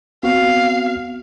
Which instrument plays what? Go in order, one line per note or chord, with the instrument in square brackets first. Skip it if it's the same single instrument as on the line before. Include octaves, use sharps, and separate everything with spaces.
[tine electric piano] B3 C4 F#4 [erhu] F5